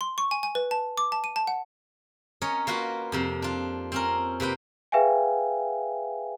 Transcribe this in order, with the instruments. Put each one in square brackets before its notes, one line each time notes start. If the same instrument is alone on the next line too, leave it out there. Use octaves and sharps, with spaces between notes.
[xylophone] C6
C#6
G#5
G#5
B4
A5
D6
A5
D#7
A5
F#5
[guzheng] C#4 A#4 C#5 D#5
A#3 F4 F#4 B4
F2 C3 F3
D4 F4
C4 C#4 A#4
C3 A#3 B4 G5
[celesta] G#4 B4 E5 F5 G5 G#5